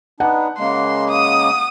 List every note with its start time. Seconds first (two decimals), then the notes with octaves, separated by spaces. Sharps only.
0.20 B3 D4 D#4 F#5
0.58 C#3 G#3 A#3 C6
1.11 D#6